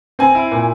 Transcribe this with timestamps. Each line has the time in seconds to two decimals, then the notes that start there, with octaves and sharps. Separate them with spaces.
0.19 C4 G#5
0.35 E4
0.51 A#2